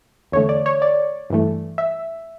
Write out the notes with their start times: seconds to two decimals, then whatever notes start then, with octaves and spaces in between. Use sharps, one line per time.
0.32 E2 D3 A3 C#5
0.49 D5
0.66 C#5
0.82 D5
1.30 G2 E3 A3
1.78 E5